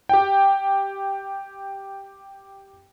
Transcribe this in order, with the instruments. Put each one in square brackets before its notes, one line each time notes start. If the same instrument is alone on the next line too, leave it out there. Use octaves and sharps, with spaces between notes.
[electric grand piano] G4 G5